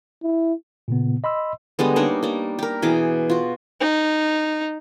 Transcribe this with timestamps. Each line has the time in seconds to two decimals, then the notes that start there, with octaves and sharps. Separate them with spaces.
0.23 E4
0.88 A#2 C#3 B3
1.24 D#5 B5 C6 E6
1.79 D3 G3 G#3 B3
1.96 A#3 D4 D#4 C#5
2.23 G3 A#3
2.59 G4 A#4
2.82 B2 E3 G#4 D6
3.30 F4 F#4
3.80 D#4